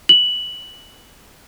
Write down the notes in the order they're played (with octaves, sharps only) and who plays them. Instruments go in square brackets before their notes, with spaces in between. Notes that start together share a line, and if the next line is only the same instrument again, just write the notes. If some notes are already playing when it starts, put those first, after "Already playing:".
[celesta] F#7